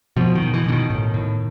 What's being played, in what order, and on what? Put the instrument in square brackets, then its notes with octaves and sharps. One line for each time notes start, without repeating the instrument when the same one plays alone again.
[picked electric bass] B2 F3
D#3
B2
E3
B2 D3
D#3
A2 D#3
A2